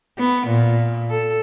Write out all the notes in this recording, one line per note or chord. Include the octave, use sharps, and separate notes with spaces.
B3
A#2
A4